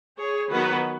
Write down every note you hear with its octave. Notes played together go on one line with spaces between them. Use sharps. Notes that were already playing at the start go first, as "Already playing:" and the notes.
G#4 C#5
D#3 F#3 B3 F#4 B4